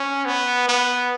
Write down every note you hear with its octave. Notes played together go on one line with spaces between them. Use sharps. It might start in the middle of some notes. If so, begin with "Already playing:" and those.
Already playing: C#4
B3
B3